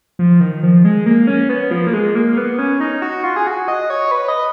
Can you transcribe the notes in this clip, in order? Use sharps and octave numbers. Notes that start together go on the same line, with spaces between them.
F3
D#3
F3
G#3
A#3
C#4
B3
F3
A#3
G#3
A#3
A#3
B3
C#4
D#4
F#4
F4
G#4
F#4
D#5
C#5
B4
D#5